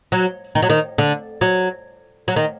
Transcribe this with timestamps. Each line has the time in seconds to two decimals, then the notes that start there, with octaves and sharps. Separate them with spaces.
0.12 F#3
0.55 D#3
0.62 F#3
0.70 D#3
0.98 D3
1.41 F#3
2.28 F#3
2.36 D#3